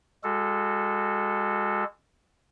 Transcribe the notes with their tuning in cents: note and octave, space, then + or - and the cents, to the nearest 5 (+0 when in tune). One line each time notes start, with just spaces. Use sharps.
G#3 -30 F#4 -10 A4 +0